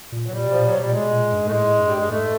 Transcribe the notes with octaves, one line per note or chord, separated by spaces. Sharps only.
A#2
F#3
A#2 G3
B2
F3
A#2
F#3
B2
G3
A#2
G#3
B2
A#2
G2
G#2
A3
A2 G#3
G2
G3
G#3
G#2 A3